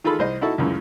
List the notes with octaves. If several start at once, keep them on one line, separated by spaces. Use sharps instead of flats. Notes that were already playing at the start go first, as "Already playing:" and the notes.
D#3 F4 G#4 A4 B5
C2 C5 D#5
D#4 E4 F#4 A4 A5
C#2 F#2 A2 C#3